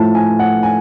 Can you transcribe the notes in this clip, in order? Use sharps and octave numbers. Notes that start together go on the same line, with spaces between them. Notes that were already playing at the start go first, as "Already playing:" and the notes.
Already playing: A2 F3 A3 A5
G#5
F#5
G#5